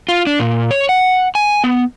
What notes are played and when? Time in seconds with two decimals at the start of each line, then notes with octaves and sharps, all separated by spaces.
0.09 F4
0.27 D4
0.39 A#2
0.71 C#5
0.89 F#5
1.35 G#5
1.64 B3